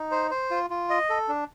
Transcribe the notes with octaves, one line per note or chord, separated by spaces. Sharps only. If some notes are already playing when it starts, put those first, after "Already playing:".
Already playing: D#4
C5
C5
F4
F4
D#5
A4
D4